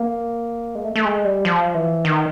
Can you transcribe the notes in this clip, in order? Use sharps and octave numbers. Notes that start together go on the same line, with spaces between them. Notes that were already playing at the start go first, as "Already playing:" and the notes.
Already playing: A#3
G#3
A3
A3
G#3
G3
F3
E3
D#3